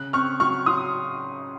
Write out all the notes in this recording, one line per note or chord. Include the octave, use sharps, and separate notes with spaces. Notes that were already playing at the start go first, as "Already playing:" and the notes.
Already playing: C#3 F#6
C4 C#6 F6
F#3 C#6 F6
F#3 C6 D#6